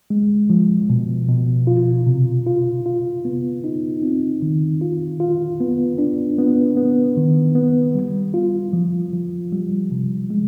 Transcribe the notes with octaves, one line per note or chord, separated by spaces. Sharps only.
G#3
F3
B2
B2
F4
C3
F4
F4
B3
D#4
C4
D#3
F4
F4
B3
D4
B3
B3
D#3
B3
G3
F4
F3
F3
G3
C3
G#3